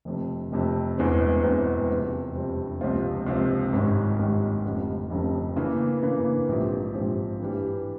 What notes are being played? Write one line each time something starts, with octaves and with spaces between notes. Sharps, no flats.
F1 F2 C3
F1 F2 C3
E1 E2 E3 G#3 C4
E1 E2 E3 G#3 C4
F2 C3 G3 C4
F2 C3 G3 C4
C#2 C3 F3 C4 F4
C#2 C3 F3 C4 F4
G#1 G#2 G3 C#4
G#1 G#2 G3 C#4
F1 F2 C#3 G3
F1 F2 C#3 G3
C#3 E3 A#3
C#3 E3 A#3
A#1 G#2 F3 C4 G4
A#1 G#2 F3 C4 G4
G2 E3 G3